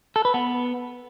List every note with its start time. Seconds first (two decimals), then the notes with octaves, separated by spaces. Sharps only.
0.16 A4
0.25 B4
0.34 B3